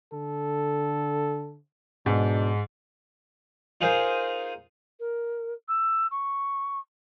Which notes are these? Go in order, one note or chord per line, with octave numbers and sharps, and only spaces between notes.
D3 A4
G#2 B2 D4
D#4 F4 G#4 A#4 C5
A#4
E6
C#6